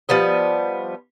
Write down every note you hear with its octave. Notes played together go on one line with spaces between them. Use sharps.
F3 G3 B3 D#5